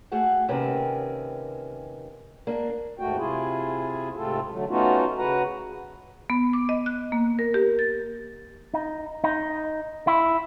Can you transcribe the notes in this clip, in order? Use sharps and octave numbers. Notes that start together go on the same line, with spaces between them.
A3 F#4 G#4 F#5
D#2 C3 C4 C#4 A#4 B4
A#3 D4
D#2 G#2 A3 F#4 G5
C3 E4 F4 G#4
G#2 C3 A3 C4 F4 A4
D3 F#3 A3
A3 B3 C#4 D#4 F4 F#4
C#3 F#4 B4 F#5 A#5
B3
D6
D#5
F#6
A#3
A#4
G4
A6
D#4
D#4
E4